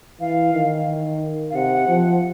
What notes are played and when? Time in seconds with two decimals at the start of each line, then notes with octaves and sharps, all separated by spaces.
0.20 E3 F5
0.54 D#3
1.50 F5
1.54 C3 F#5
1.88 F3